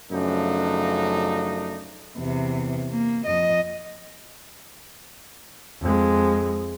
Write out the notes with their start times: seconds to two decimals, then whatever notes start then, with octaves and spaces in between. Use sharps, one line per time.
0.12 F#2 C#3 F3 A3 D4 D#4
2.18 E2 C3
2.91 A#3
3.26 F2 D#5
5.81 F2 G#3